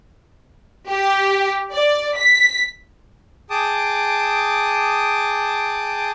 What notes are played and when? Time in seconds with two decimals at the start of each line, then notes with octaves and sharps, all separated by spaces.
0.87 G4
1.72 D5
2.15 B6
3.50 G#4 G5 A5 D6 D#6